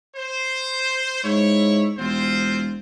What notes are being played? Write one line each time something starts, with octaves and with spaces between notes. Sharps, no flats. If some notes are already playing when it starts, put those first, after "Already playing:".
C5
G#2 E4 C#5
E1 C4 F4 C5